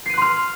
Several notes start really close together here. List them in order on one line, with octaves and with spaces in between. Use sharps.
C7 D#7 F#6 C6 F6